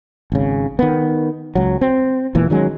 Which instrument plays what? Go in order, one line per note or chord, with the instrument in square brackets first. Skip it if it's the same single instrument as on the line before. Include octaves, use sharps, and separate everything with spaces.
[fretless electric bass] G#1 C#3
D#3 B3
C#2 F#3
C4
E1 A#2 E3
D#3 F#3 G#3 C#4